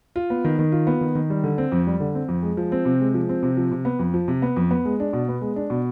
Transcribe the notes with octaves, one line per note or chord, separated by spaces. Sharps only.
F4
B3
D#3
D#3
F4
B3
D#3
D#3
G3
D3
C4
F2
G3
D3
C4
F2
G#3
F3
C4
C3
G#3
F3
C4
C3
F3
C3
B3
F2
F3
C3
B3
F2
B3
G#3
D4
B2
B3
G#3
D4
B2